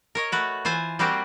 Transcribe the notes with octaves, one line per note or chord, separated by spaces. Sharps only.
A#4 C#5 D#5
A3 F#4 B4
E3 F4 C5 G#5
G3 A#3 C4 F#4 G4